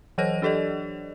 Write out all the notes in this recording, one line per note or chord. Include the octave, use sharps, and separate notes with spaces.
E3 F#3 C5 C#5 D#5 A#6
D4 G4 A4 D5 D#5